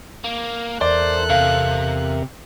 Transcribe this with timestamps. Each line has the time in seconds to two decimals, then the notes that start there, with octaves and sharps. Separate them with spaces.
0.24 A#3
0.81 E2 A4 A#4 C5 D5 E5 F#6
1.30 C3 F5